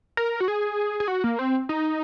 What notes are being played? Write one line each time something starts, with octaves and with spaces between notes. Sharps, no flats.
A#4
F#4
G#4
G#4
F#4
A#3
C4
D#4